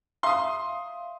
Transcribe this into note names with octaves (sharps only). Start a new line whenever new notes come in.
E5 F5 C6 D#6